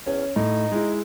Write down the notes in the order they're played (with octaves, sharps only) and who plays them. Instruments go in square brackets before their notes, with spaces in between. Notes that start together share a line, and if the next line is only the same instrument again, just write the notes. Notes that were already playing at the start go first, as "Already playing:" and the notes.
[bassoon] E2 [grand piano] C#4
[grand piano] A2 [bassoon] D#4
[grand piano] G#3 E4